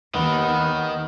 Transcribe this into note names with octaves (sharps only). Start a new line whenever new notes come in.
D#2 D#3 B3